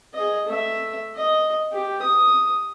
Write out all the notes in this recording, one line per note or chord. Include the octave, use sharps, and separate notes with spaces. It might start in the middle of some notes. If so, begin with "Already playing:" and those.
G#4 D#5
A3 E5
D#5
G4
D#6